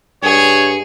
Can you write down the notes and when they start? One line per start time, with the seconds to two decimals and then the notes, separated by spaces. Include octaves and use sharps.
0.23 G2 G#4 C#5